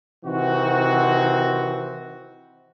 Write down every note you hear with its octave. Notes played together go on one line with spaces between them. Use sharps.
C3 D#3 E3 C4 D#4 F#4